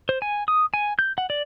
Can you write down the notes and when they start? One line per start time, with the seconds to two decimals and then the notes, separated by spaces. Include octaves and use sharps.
0.09 C5
0.22 G#5
0.48 D#6
0.74 G#5
0.99 G6
1.18 F#5
1.30 D5